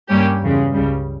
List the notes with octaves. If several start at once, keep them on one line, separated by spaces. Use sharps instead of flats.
G2 G3 A#3 C#4 G4
E2 C#3 G#3
C#2 C#3 G3